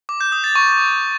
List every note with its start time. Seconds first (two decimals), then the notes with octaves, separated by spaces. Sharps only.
0.09 D6
0.21 G6
0.32 D#6
0.44 A6
0.55 C#6